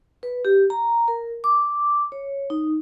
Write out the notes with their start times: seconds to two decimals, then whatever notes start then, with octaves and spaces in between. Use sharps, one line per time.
0.23 B4
0.45 G4
0.70 A#5
1.08 A#4
1.44 D6
2.12 C#5
2.50 D#4